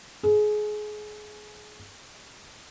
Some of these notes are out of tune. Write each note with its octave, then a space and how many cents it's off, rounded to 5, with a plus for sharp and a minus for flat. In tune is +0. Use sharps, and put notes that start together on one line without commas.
G#4 +25